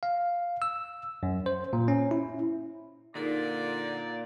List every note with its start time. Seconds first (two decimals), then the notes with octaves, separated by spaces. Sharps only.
0.03 F5
0.62 E6
1.23 F#2
1.46 C5
1.73 A#2
1.88 C#4
2.11 E4
3.15 A#2 D3 D#4 G#4 A#4 D5